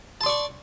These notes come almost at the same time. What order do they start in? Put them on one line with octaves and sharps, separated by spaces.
A5 C6 D5 C#6